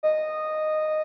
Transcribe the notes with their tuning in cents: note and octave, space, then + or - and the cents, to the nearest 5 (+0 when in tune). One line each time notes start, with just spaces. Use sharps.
D#5 -10